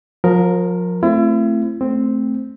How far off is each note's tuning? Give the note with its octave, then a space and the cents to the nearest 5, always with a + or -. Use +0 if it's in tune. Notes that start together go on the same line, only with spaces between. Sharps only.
F3 +35 A#4 +0
A3 +0 C4 +0 E4 +40
A3 +0 C4 +0